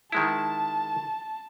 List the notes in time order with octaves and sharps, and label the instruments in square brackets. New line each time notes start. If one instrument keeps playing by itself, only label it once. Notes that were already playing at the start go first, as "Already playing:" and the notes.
[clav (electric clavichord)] D#3 G#3 E4 [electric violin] A5